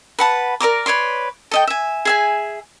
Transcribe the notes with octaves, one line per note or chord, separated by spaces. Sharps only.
B4 F#5 A5
A#4 D5 A#5 D6
B4 C#5 D5 C6
A4 D#5 G5
E5 G#5
G#4 E5 G#5